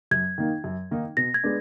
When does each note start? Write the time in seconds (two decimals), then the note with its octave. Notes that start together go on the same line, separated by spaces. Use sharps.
0.11 F#2 G#6
0.38 D#3 A#3 D#4
0.64 F#2
0.91 D#3 A#3 D#4
1.17 B2 A#6
1.34 G#6
1.44 G#3 B3 D4